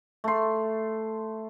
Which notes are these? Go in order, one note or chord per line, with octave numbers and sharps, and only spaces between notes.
A3 C6